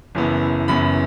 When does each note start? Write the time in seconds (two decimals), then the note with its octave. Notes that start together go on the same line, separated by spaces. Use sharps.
0.15 F#1 F#2 E3 B3
0.68 F#1 F#2 E3 B3 B5